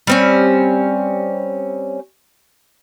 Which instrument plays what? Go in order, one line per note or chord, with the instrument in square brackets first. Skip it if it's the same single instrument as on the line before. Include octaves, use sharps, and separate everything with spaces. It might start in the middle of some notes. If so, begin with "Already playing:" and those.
[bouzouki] G3 C4 C#4